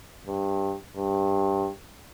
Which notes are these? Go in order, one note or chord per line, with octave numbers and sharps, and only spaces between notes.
G2
G2